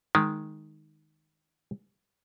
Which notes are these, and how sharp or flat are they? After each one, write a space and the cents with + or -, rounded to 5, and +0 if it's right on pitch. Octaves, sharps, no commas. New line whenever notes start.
D#3 +0 G#3 +0